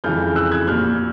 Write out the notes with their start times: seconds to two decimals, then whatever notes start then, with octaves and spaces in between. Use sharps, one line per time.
0.04 F2 C#3 E3 G#3 F6 G6
0.36 E6 F#6
0.51 F#6 G#6
0.67 A#1 A#2 G3 F6 G6